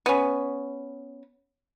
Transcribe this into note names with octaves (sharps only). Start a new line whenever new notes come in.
B3 C#4